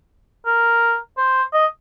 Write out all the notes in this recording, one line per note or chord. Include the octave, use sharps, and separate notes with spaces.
A#4
C5
D#5